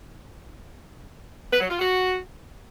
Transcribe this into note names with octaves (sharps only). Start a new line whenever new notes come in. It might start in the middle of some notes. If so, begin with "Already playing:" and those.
B4
F#3
F4
F#4